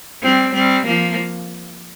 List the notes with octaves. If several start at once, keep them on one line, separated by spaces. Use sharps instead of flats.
G3 C4
G3 C4
F3 A#3